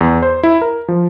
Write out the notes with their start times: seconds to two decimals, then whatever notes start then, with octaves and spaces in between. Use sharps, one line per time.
0.01 E2
0.23 C5
0.43 E4
0.62 A#4
0.88 F3